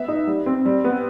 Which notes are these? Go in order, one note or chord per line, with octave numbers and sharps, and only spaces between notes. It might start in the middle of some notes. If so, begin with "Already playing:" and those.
Already playing: B3 E5
D#4
G3
C4
G3
B3